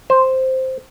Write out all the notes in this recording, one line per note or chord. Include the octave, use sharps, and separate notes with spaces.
C5